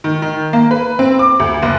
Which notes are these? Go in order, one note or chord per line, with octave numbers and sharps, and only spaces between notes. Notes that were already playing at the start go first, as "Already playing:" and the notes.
D#3
D#3
A#3
B4
C4
D6
D2
F#1